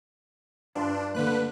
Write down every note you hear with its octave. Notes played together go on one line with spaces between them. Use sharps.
G2 D4 F4 G5 B5 C6
D3 A3 A#3 B4 F#6